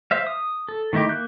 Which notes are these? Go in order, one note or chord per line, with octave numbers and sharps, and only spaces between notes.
C5 E5 F5
D#6
A4
D#3 A3 D#4 E4 G4
A#3 F#6 G6